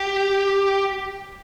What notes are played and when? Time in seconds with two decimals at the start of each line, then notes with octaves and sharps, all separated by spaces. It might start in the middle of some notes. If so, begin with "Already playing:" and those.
Already playing: G4